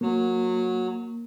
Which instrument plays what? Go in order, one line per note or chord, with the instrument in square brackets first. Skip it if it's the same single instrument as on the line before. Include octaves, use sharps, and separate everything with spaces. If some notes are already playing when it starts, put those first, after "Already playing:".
[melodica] F#3 [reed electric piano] A#3